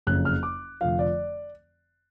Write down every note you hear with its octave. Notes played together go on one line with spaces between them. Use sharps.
F#1 F2 C#3 F#6
F6
D6
F1 F2 D3 F3 F5
D5